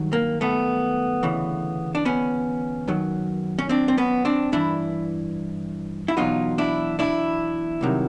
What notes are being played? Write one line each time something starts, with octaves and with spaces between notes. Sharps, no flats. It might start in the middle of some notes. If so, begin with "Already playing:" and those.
Already playing: G2 D#3 F#3
A#3
A3 B3
D2 C#3 E3
D4
B3 C#4
F#2 D#3 F#3
C#4
C4 D4
C4
B3 C#4
C4 D4
G2 E3 D4 E4
E4
E2 B2 F#3 D#4 F4
D4 E4
D4 E4
C2 C3 D#3 F#3